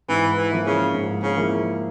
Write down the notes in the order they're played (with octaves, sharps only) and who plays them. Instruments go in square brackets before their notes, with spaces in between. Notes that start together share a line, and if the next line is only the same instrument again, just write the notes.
[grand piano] G#2 [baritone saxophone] E3
[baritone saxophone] E3
[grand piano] F3 A#3 E4
[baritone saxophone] C#3
[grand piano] G#2
[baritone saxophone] C#3
[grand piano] F3 A#3 E4